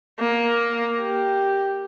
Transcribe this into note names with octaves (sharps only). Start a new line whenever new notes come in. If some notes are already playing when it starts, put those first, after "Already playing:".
A#3
G4